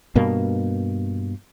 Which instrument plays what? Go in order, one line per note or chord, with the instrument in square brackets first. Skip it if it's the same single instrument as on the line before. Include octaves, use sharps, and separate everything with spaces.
[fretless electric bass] G2 B2 A#3